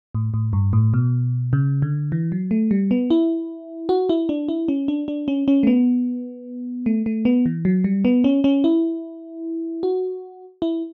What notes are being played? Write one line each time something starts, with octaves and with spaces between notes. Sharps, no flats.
A2
A2
G2
A2
B2
C#3
D3
E3
F#3
A3
G3
B3
E4
F#4
E4
D4
E4
C#4
D4
D4
C#4
C#4
A3
B3
A3
A3
B3
E3
F#3
G3
B3
C#4
C#4
E4
F#4
E4